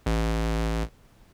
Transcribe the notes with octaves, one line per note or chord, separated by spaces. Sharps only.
A1